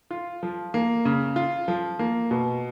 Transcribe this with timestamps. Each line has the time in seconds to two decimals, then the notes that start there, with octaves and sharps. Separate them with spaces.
0.11 F4
0.43 F3
0.74 A#3
1.05 C#3
1.36 F4
1.68 F3
1.99 A#3
2.31 B2